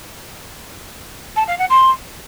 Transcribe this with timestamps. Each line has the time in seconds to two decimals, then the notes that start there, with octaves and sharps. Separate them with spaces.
1.36 A5
1.47 F5
1.58 F#5
1.69 C6